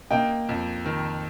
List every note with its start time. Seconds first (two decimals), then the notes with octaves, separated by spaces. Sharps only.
0.11 A#3 D#5 G5
0.49 F2
0.86 D#3